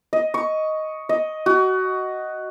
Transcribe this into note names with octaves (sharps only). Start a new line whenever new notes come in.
D#5
C#6
D#5
F#4